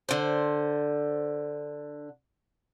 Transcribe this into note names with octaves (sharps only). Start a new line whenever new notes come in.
D3 C5